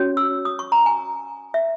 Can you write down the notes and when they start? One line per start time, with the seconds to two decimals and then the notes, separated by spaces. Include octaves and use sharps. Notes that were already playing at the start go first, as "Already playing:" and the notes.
Already playing: C#4 F#4 C#5
0.17 E6
0.45 D#6
0.59 C#6
0.72 A#5
0.86 G#5
1.54 E5